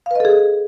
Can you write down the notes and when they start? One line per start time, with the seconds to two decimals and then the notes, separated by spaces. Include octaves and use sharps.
0.06 F5
0.11 B4
0.15 D#5
0.20 A4
0.25 G#4